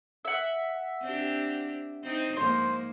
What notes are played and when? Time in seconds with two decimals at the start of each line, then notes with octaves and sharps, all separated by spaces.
0.25 E5 F#5
1.02 C4 D4 G4
2.03 C4 D#4
2.37 G#2 F3 A#3 C5